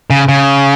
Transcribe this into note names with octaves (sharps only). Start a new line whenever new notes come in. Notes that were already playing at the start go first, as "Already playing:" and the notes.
C#3
C#3